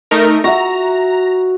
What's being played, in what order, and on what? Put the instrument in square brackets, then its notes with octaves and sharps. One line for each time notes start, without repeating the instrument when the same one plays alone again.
[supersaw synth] A3 D#4 A#4
[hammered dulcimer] F#4 E5 [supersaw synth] A#5